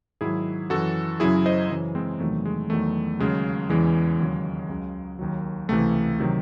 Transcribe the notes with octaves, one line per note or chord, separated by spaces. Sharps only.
G#2 D#3 F#3 E4 G#4
F#2 E3 F#4 A4
F#2 C#3 F#3 E4 G#4
C5 D#5
F#2 C#3 E3
G#3 C4
E2 C3 D#3 F#3 A3
G#3
E2 D#3 F#3 A3
D#2 C#3 F#3 G#3
E2 C#3 E3 G#3
D#2 C#3 F#3
C#2 C#3 F#3
D#2 D#3 F#3
C#2 C3 E3 A3
C3 D#3 F#3